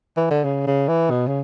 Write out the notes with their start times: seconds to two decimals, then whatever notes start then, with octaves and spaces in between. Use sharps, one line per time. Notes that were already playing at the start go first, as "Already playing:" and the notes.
0.17 E3
0.31 D3
0.44 C#3
0.67 C#3
0.88 E3
1.11 B2
1.27 C#3